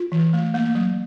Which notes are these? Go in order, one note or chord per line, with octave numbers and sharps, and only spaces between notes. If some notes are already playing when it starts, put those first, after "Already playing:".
Already playing: F4
E3
A3
A#3
F#3